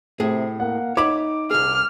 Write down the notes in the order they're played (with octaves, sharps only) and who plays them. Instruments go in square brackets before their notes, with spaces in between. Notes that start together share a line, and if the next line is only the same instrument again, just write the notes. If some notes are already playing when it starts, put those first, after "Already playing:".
[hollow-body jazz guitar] A2 G#4 [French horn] C3
[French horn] A#3 [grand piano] F#5
[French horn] D#4 [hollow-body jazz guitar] C#5 E5 B5 [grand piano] D6
[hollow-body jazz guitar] C2 G#4 [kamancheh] F6